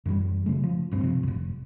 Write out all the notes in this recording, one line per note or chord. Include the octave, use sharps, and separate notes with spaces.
F#2 E3 F#3 G3
C#3 F#3 A3
F3
D2 G2 C4
C3 F3
F1 F#2